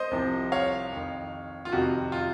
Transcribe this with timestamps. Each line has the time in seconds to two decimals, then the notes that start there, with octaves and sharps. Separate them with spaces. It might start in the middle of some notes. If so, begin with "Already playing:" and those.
Already playing: C5 D#5
0.11 C2 C3 F3
0.52 C#5 F5
0.92 F2 D#3
1.65 F4
1.72 F2 C3 D#3 F#4
2.12 F4